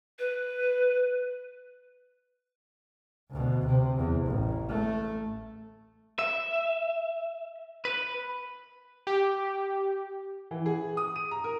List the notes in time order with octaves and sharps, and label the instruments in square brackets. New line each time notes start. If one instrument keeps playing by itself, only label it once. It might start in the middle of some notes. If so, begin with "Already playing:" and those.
[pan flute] B4
[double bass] D2 B2
C3
E2
A1
A3
[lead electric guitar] E5
B4
[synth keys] G4
[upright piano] E3
G#4
D#6
D#7
A#5
A#4